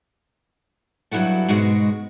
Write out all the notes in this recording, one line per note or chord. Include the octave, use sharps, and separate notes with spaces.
G2 F#3 C#4 E4 F#4 A4
G#2 B2 G#3 F#4